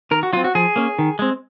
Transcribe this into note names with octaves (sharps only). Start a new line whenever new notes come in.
D#3 A#4
F#4
F#3 C4 F4
F#4
F3 G#4
A#3 C#4
D#3
G#3 C4